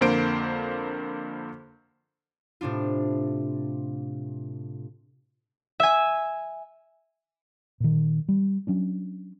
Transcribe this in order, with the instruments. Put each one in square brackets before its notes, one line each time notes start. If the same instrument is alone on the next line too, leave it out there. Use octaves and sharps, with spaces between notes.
[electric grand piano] F2 D3 A#3 C5 D7
[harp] A2 C3 D4 F4
E5 G#5
[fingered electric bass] A#2 D#3
G3
F#3 C#4 D4